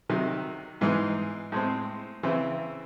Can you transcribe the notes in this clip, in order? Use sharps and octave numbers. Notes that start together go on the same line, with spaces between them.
C3 D#3 F#3
G#2 E3 G#3 D#4
A2 G#3 C4
C#3 E3 C4 E4